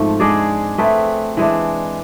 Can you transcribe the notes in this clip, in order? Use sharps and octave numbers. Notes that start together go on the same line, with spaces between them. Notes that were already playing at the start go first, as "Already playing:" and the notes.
Already playing: G#2 F3 A3 C4
G#3 D4 G#4 D5
A3 C4 G#4 B4
E3 G#3 D4